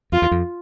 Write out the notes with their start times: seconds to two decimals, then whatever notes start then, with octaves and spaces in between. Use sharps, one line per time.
0.12 F2 F4
0.22 E2
0.31 F2